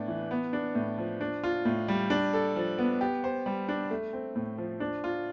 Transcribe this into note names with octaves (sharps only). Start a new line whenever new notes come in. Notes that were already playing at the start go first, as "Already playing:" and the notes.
Already playing: A2 B3 D4
E3
B3
D4
A2
F3
D4
F4
A2
G3
D4
A4
F3
B3
G4
C5
G3
D4
A3
C4
A2
F3
D4
F4